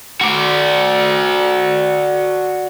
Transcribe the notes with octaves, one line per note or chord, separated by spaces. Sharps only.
F#4 D5